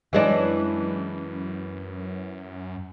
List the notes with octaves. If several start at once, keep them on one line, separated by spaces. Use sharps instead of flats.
F#2 E3 G#3 D4